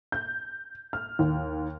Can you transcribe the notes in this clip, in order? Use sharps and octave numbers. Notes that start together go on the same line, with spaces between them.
G6
F6
D#2